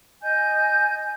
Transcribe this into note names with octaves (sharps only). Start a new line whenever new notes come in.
D#5 G#5 G6